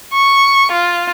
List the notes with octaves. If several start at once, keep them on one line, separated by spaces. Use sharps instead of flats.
C#6
F4